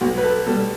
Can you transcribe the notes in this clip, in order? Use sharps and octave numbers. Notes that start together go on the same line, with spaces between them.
B1 F#4
B4
A4
B2 G3 A4